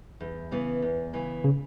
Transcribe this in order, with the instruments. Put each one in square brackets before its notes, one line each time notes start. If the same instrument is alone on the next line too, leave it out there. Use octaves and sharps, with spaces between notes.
[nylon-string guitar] E2
C#3 E3 B3
E2
C#3 E3 B3
[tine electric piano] C#3